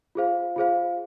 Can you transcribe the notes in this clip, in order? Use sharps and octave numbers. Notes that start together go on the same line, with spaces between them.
F4 G#4 C5 F5
F4 G#4 C5 F5